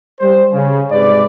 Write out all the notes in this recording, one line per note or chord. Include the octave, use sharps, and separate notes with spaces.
G3 C5
C#3
G#2 C3 G#4 B4 D5